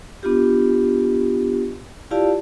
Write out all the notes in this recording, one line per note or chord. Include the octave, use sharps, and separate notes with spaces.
B3 D4 F4 G4
E4 F4 G4 D5 F5 A5